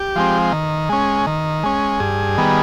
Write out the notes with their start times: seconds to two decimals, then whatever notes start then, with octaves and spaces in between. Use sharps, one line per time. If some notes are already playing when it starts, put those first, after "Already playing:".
Already playing: G4
0.16 F3 G#3 C4
0.52 D#3
0.89 G#3 C#4
1.27 D#3
1.63 G#3 C#4
2.00 G2 G#4
2.37 D#3 G3 B3